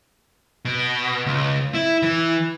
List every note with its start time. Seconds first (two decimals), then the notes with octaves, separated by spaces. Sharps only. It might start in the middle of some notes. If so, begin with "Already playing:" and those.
0.65 B2
1.26 C#2
1.74 E4
2.03 E3